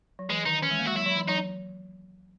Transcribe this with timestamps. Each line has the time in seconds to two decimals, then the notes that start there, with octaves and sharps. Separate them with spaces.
0.19 F#3
0.30 E3 G#3
0.46 D#3 D#4
0.62 E3 C#4
0.71 G#3
0.79 A#3
0.86 G#3 F#4
0.95 F#3 E4
1.06 F#3
1.17 E3
1.28 F#3 D#4